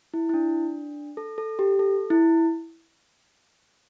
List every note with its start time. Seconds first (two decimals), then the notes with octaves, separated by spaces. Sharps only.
0.14 E4
0.29 E4
0.34 D4
1.17 A4
1.38 A4
1.59 G4
1.79 A4
2.10 E4